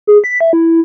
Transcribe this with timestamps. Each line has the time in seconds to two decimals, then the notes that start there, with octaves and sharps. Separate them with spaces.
0.07 G#4
0.24 B6
0.41 E5
0.53 E4